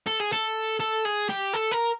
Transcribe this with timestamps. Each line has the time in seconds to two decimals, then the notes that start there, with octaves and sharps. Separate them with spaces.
0.07 A4
0.20 G#4
0.32 A4
0.80 A4
1.05 G#4
1.29 G4
1.53 A4
1.71 A#4